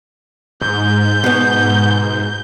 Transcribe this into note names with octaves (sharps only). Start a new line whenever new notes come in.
G#2 G6
B2 B3